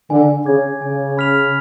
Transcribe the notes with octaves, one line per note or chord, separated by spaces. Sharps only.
D3 G#5
C#3 D6 G#6
C#3 G#5
B5 F6 B6 F7